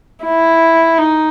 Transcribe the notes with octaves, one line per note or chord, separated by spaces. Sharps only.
E4
D#4